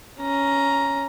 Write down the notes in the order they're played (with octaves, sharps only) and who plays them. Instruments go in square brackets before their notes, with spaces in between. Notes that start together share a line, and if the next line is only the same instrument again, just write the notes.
[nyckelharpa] C#4 A#5